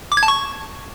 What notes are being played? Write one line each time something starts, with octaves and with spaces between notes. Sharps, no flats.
D6
G#6
A5
C#6